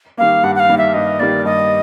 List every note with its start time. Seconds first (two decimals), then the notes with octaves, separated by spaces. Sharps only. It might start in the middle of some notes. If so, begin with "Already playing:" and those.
0.17 D#3 G3 A#3 F5
0.43 G2 F#5
0.55 F#5
0.60 F5
0.69 D#3 G3 A#3
0.78 E5
0.94 G2 D#5
1.19 D#3 G3 A#3 D5
1.45 G2 D#5